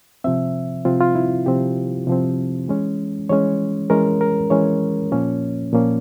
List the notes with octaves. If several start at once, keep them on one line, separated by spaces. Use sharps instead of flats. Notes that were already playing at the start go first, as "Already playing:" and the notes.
C3 F3 C4 E5
C3 F3 C4 F4
F4
E4
C3 F3 C4 G4
C3 F3 C4
E3 G#3 C#4
E3 G#3 C#4 C#5
E3 G#3 C#4 A#4
A#4
E3 G#3 C#4 C#5
A#2 F3 A#3 C#4
A#2 F3 A#3 C#4